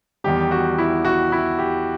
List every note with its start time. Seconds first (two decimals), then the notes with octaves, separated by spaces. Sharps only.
0.24 E2 D#3 G3 G4
0.51 F#4
0.78 E4
1.05 F#4
1.32 E4
1.59 G4